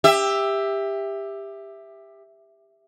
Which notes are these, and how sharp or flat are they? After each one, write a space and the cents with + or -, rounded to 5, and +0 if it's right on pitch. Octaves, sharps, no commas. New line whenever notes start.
G4 +20 E5 +0